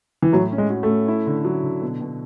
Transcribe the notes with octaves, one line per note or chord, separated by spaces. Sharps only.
E3
A2 F#3
C#4
G#3
F#4
A3
C#4
E4
D3
F#3
D3
B2
B2